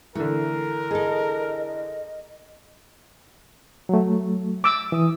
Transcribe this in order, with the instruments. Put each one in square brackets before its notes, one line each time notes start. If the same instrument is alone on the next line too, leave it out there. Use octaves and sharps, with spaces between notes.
[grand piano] D3 E3 [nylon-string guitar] A3 [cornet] A#4
[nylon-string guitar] G#4 A4 [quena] D#5
[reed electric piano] F#3 A3
[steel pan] D6 E6
[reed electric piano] E3 D#6